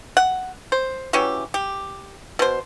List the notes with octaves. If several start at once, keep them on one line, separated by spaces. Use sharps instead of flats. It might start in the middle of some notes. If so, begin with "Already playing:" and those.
F#5
C5
E3 F#3 C#4 G4
G4
B2 C5